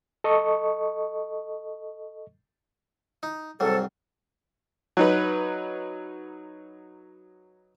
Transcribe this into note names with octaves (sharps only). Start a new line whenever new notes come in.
A4 D#5 C#6
D#4
C2 G#2 F#3 A4
F#3 D#4 B4